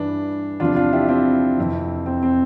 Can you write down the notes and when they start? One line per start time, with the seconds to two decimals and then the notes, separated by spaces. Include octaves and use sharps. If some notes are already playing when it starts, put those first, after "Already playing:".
Already playing: G2 E3 D4
0.60 E2 C3 F3 D4 F4
0.76 D4 F4
0.93 E4 G4
1.09 C4 E4
1.57 F2 C3 E3
2.06 C4
2.23 C4